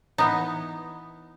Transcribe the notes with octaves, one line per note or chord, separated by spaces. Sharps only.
E3 B3 D#4